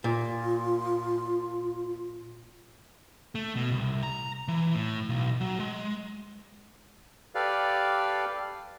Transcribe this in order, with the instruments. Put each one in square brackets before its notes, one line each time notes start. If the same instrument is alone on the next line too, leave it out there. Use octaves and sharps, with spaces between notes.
[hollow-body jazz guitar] A#2 [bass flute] F4
[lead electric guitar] A3
B2
C2
A#5
E3
A2
B1
F#3
G#3
[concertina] G4 A4 B4 D5 F5